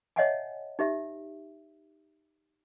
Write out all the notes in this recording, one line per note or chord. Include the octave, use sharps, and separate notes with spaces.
C#5 D#5 E5 F#5 G#5 A5
D#4 G4 E5